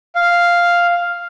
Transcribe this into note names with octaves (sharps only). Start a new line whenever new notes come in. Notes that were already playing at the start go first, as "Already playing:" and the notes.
F5